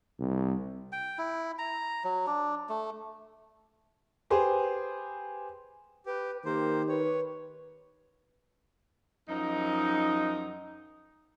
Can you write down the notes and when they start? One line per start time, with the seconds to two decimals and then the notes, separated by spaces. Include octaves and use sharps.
0.20 C2
0.92 G5
1.18 E4
1.59 A#5
2.04 F#3
2.27 D4
2.69 A3
4.30 G4 G#4 B4 C5
6.06 G4 B4
6.45 D#3 A#3 G4 C5
6.89 B4 C#5
9.29 F#2 F3 D#4